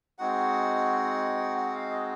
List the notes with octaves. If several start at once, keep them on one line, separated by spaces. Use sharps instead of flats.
G#3 C4 D#4 F#4 F#5
F#5
F5
D#5